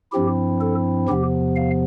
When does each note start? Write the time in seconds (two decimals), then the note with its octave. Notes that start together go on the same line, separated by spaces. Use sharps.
0.12 G2 F3 C4 E4 G4
0.61 A4
1.08 E2 C3 F3 B3 G4
1.56 F5